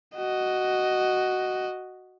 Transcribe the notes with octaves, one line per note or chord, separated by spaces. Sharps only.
F#4 D#5